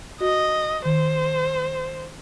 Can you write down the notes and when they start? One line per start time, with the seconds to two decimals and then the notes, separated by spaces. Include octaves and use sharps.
0.21 F#4 D#5
0.85 D#3 C5